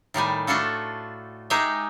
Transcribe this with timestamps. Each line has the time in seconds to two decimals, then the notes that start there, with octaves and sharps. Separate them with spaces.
0.14 A2 D#3 G3 G#5
0.47 A3 D4 F4 F#4 A4
1.50 G#3 D#4 G4 G#4 E5